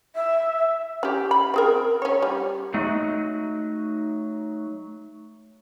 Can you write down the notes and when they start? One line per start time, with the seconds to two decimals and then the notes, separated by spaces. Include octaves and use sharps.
0.15 E5
1.03 C#4 G4
1.31 B5
1.54 C4 G#4 A#4
2.02 C#4 C#5
2.22 G3
2.74 F#3 A3 D#4 F#4 D#5